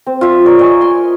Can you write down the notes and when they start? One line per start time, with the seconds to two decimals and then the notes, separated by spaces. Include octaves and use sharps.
0.06 C4
0.21 F4 E5
0.45 A#4 C#5 D5
0.59 D#5 G#5 C#6
0.81 G#5 C6